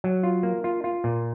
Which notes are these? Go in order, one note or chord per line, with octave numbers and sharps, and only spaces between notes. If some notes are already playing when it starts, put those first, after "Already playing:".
F#3
F4
A#3
F4
F4
A#2